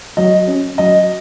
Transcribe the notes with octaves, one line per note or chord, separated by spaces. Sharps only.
F#3 D#5
C#4
F#3 D#5